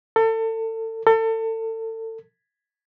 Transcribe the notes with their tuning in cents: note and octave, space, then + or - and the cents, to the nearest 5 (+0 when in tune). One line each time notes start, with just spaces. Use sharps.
A4 +30
A4 +30